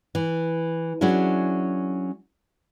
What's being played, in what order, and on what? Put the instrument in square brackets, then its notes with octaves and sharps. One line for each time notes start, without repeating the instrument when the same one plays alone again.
[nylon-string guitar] E3
F#3 C#4 D4 E4 G#4